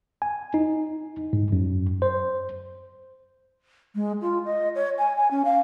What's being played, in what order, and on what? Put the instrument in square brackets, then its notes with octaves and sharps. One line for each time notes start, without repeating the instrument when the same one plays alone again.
[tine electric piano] G#5
D#4
G#2
F#2
C5
[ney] G#3
F4
D#5
C#5
G#5
G#5
C#4
F5